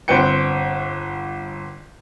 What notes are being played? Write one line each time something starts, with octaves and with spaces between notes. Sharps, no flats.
G1 C4 B4 G5 C#7